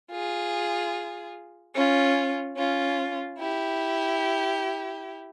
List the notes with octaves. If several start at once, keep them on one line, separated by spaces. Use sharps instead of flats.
F4 G#4
C#4 F4
C#4 F4
E4 G4